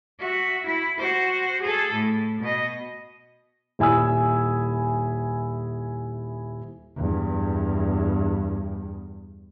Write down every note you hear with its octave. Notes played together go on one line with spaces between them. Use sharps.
F#4 E5
E4
F#4 C5
G#4 A4
A2
B2 D#5
D#1 E4 G#5 D#6 E6
E2 G2